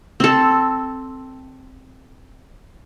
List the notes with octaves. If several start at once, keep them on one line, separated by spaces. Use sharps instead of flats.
C4 A4